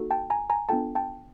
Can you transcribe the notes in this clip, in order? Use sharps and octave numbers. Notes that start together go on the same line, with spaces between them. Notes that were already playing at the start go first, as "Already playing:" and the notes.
Already playing: A#3 D#4 F#4 A4
G5 A5
G#5 A#5
G#5 A#5
B3 D4 F4 A4 G5 A5
G5 A5